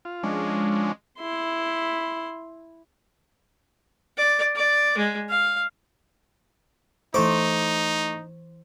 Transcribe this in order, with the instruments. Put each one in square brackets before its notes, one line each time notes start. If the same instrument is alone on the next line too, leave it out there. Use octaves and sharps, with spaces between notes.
[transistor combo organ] F4
[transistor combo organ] F3 C#4 D4 [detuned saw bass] G#3
[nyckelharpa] E4 C6
D5
D5
G#3
F5
[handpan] E3 C5 [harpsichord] A3 D6 [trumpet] D#4